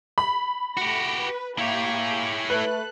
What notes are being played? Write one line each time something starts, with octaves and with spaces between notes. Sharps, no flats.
B5
A3 F#4 G4 A#6
B4
A#3 E4 G4 C#5 E5
G4 G#4
A3 A4 B4 F#6